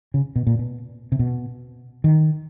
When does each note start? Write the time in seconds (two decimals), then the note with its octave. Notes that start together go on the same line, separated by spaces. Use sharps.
0.14 C#3
0.36 B2
0.47 A#2
0.59 B2
1.12 C3
1.19 B2
2.04 D#3